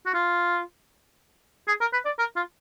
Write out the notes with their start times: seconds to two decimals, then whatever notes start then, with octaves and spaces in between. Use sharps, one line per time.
0.06 F#4
0.14 F4
1.68 G#4
1.81 A#4
1.93 B4
2.05 D5
2.19 A#4
2.36 F4